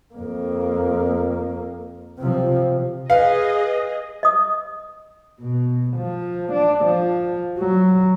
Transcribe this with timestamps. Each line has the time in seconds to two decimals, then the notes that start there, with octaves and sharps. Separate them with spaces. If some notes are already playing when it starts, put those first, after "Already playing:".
0.14 F2 A#3
2.19 C3 F3
3.10 G#4 B4 D#5 F5
4.23 D#5 D#6
5.40 B2
5.97 F3
6.52 D4
6.85 F3
7.58 F#3